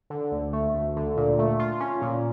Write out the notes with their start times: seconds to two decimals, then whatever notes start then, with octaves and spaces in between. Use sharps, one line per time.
0.10 D3
0.32 D2
0.53 A3
0.75 D2
0.96 D3
1.17 A#2
1.39 A3
1.59 F4
1.80 C#4
2.02 A#2